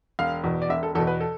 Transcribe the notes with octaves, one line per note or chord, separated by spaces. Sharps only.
E1 F5
E2 B2
D5
E1 E5
A4
E2 B2 A4
B4
A4